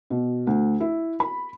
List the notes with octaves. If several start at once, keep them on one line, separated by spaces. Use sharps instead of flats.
B2
D2
E4
B5